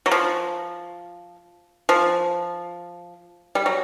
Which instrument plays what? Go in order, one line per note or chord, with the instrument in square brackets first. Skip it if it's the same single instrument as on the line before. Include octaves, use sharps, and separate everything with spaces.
[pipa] F#3
F3
F3
G3
F#3